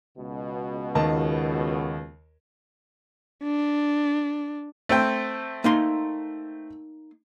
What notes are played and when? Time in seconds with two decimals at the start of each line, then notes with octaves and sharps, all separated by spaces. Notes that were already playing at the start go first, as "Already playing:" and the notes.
0.18 C#2 B2
0.95 D#2 D#5 A5
3.44 D4
4.89 A3 C4 G5
5.64 A#3 D#4 C6